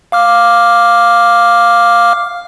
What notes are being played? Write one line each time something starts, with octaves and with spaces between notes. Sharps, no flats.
F5 D6 F6